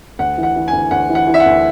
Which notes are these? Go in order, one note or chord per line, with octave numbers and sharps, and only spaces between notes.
D2 F#5
E3
F#5
E3
G#5
D2
D2 F#5
E3
F#5
E3
E5
F#5
D2